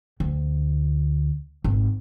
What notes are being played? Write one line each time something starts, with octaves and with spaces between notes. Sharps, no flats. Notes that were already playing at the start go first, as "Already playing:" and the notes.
D2
G#1